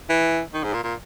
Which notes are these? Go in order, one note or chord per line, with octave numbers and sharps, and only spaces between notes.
E3
D#3
G#2
A#2
A#2